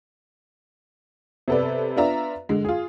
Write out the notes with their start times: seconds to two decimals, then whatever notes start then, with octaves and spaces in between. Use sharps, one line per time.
1.48 C3 B3 A4 B4 D5
1.96 B3 D4 F4 D5 E5 A#5
2.49 D3 G#3
2.65 F4 G#4